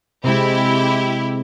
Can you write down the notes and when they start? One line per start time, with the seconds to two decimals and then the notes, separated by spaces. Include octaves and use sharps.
0.24 C3 G#3 C4 E4 G4